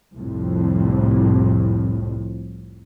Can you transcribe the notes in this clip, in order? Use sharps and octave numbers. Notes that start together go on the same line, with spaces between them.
C2 F2 A2